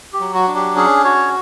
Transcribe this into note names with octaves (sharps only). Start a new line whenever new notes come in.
G4
F#3
F#4
D4
G4
C#4 G#4
F#4 C#5